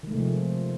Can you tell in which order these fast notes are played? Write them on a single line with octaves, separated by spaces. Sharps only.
D#3 G#3 A3 C3 F3